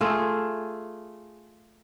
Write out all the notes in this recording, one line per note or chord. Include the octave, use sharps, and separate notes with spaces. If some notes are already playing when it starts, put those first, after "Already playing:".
A3 F4 G#4